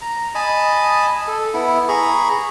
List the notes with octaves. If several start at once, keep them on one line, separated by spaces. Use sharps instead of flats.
A#5
D#5 G#5 A5 B5
A4
B3 E4
G#4 A#5 B5 C#6